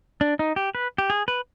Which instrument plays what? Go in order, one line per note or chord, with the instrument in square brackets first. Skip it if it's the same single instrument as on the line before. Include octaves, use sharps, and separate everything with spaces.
[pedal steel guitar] D4
D#4
G4
B4
G4
G#4
B4